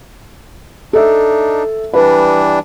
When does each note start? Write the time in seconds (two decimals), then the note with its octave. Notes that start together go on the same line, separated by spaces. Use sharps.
0.93 D4 D#4 A4 E5
1.94 E3 G3 D4 B4